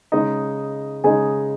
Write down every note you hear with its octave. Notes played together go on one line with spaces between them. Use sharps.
C#3 G#3 D#4 D#5
C#3 G#3 D#4 G#4 G#5